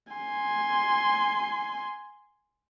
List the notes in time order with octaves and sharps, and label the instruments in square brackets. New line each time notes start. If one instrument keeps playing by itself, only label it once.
[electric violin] G#5 C6